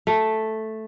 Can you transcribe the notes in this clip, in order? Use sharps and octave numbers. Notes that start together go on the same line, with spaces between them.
A3